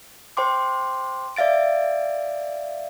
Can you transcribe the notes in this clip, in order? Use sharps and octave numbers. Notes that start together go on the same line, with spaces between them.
C5 G5 C6 D6
D5 E5 F5 A6 D7